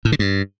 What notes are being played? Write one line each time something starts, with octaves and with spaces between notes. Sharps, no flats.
A2
D3
G2